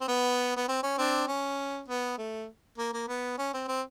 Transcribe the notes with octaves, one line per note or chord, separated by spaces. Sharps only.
C4
B3
B3
C4
C#4
C4 D4
C#4
B3
A3
A#3
A#3
B3
C#4
C4
C4